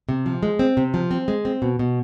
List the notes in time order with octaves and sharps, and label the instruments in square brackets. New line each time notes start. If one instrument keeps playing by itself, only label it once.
[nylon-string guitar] C3
F3
G#3
C4
C3
F3
C4
G#3
C4
B2
B2